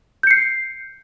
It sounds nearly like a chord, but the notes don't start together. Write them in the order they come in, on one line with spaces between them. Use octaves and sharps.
G6 C#7 C7